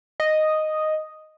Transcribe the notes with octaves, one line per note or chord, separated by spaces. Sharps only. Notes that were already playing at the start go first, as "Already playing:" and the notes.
D#5